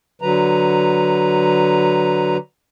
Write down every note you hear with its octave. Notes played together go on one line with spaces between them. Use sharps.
D3 F#3 B4 A#5